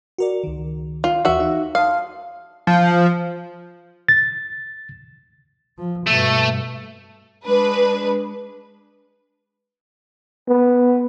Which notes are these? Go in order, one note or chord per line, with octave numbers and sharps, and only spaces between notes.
F#4 A#4 D5
C#2 D#3
F4
D#2 E3 F#4 E5
D#4
F5 A5 C6 D#6
F3
A6
F3
G2 B2 A3
G#3 D4 B4
B3